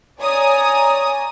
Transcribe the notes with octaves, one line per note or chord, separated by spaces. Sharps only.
C#5 D5 G#5 A#5 D#6